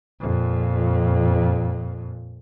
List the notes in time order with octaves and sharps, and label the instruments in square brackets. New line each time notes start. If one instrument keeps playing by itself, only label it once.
[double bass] F2 A#2